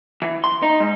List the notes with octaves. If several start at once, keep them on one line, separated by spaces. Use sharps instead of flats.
E3
C6
D#4
G#2